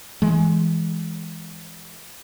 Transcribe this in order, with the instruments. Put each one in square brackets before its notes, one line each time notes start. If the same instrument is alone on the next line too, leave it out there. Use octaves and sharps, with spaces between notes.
[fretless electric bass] E3 G#3